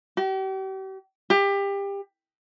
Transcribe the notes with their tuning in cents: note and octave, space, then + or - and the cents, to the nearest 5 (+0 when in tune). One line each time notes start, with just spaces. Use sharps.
G4 -40
G4 +25